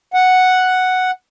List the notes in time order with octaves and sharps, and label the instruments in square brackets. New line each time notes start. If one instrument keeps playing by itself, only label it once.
[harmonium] F#5